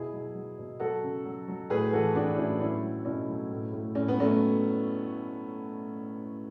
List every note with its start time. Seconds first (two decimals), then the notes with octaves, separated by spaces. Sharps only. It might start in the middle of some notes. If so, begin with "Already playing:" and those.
Already playing: B2 E4 G#4
0.13 F#3
0.35 F#3
0.58 B2
0.80 F#3 F#4 A4
1.03 C#3
1.25 F#3
1.48 F#3
1.70 A2 G#4 B4
1.93 E3 F#4 A4
2.15 E3 D4 F#4
2.37 A2 C#4 E4
2.60 F#3 C#4 E4
2.83 F#3
3.05 B2 C#4 E4
3.28 F#3
3.51 A2
3.73 A2
3.95 A2 C#4
4.08 B3
4.18 F#3 A3 C#4